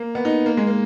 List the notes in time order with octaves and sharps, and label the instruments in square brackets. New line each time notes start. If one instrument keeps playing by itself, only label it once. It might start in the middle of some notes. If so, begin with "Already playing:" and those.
Already playing: [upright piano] A#3
B3
D#4
A#3
G#3
A#3